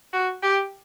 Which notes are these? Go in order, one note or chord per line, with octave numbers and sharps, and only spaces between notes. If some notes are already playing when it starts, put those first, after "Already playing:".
F#4
G4